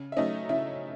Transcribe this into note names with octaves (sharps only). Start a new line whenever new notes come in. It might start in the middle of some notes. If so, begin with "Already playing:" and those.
Already playing: C#3
E5
F#3 A3 C#4 D#4 D#5
C#3 E4 E5